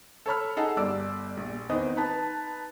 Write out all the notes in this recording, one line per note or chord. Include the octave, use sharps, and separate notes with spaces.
A4 C#5 B5 F6
D#4 G#4 A4 D#5 F#5
G1 G3 D5 D6 E6
A#1
E2 D#3 B3 C4 D#5 D#6
D#4 B4 A5